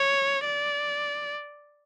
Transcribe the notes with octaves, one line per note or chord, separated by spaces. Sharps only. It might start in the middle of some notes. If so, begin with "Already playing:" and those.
Already playing: C#5
D5